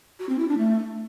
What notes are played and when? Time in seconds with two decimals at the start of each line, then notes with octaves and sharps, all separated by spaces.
0.19 F#4
0.29 C4
0.38 E4
0.48 D4
0.58 A3